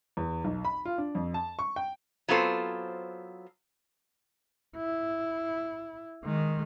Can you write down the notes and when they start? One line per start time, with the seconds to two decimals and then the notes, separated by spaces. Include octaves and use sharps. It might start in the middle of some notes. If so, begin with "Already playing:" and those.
0.17 E2
0.44 B1
0.65 B5
0.85 F4
0.98 D4
1.15 F2
1.34 A5
1.59 C#6
1.76 G5
2.28 F#3 B3 C4 F4 A4 C5
4.77 E4
6.24 D#3 G#3